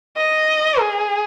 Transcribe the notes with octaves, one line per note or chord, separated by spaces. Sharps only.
D#5
G#4